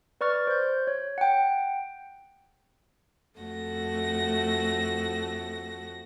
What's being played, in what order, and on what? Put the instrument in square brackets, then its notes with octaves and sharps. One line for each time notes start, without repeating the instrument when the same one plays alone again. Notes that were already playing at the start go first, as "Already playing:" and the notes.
[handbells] B4 D5 C#6 F6 A6
C5 G6
C#5
F#5 G5
[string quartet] F2 A3 F#4 A#6